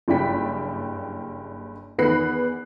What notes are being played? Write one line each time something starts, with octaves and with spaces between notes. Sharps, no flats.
F#1 G2 E4 D5 G5 B6
E2 D#3 B3 B5 F#6 C7